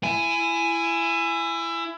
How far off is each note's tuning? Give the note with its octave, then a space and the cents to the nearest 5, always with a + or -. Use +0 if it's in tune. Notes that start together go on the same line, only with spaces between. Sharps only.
E4 +25 G#5 +0